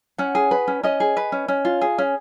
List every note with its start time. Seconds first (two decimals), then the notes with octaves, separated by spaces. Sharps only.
0.18 C#4 F#5
0.35 G#4
0.51 B4
0.68 C#4
0.83 C#4 D#5
1.00 G#4
1.17 B4
1.32 C#4
1.48 C#4
1.65 F4
1.81 G#4
1.98 C#4